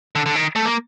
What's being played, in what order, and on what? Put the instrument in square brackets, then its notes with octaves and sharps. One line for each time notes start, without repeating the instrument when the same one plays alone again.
[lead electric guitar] D3
D3
D#3
A3
A#3